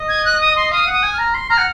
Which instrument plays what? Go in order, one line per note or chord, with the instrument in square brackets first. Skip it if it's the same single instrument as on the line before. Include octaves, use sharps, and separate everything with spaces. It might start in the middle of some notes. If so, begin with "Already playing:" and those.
Already playing: [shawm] D#5
[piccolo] G#6
F#6
D#6
C6
[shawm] F5 [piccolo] D#6
[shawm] F#5
[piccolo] D#6
[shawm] G#5
[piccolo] F6
[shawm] A#5
C6
[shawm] A#5 [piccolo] F6
[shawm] F#5